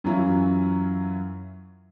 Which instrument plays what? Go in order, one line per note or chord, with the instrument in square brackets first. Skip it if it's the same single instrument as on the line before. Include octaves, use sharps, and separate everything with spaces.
[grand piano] F#2 E3 F#3 C#4 E4 F4